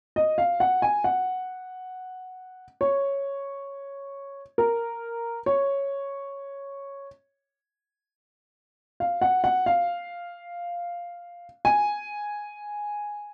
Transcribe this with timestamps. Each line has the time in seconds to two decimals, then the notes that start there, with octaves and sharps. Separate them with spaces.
0.16 D#5
0.38 F5
0.60 F#5
0.82 G#5
1.04 F#5
2.81 C#5
4.58 A#4
5.46 C#5
9.00 F5
9.22 F#5
9.44 F#5
9.66 F5
11.65 G#5